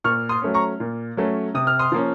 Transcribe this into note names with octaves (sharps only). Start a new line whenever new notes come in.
A#2 C#6 F6
C6 D#6
F#3 A3 C#4
A#5 C#6
A#2
F#3 A3 C#4
C3 D#6
F6
C6 D#6
F3 A#3 C#4